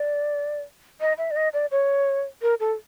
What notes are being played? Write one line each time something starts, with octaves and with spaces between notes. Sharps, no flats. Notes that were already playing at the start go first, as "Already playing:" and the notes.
Already playing: D5
D#5
E5
D5
D#5
D5
C#5
A#4
A4